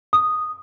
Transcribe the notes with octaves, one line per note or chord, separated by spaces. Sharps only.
D#6